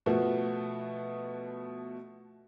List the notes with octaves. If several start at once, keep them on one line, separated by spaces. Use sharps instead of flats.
B2 F3 A3 B3 F#4